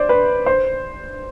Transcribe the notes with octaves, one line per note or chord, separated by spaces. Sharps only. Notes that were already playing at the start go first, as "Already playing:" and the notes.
Already playing: C5 D5
B4
C5